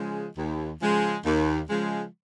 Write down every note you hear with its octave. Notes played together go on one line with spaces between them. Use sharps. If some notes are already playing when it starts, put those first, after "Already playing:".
Already playing: C#3 F3 G#3
D#2
C#3 F3 G#3
D#2
C#3 F3 G#3